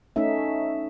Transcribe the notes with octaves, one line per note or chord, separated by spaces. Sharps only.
A3 C#4 D#4 E5